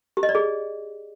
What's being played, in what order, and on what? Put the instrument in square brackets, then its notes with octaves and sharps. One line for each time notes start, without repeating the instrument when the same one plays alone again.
[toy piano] G4
D#5
D5
G#4